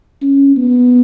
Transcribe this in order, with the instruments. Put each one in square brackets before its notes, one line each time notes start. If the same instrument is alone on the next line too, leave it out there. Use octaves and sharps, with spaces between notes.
[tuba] C#4
B3